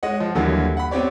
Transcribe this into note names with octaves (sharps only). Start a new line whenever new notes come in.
G#3 C#5 D#5 F#5
F3
D#2 D3 E3 F#3 G3 A#3
F#5 B5
B3 C4 G4 C#5 D5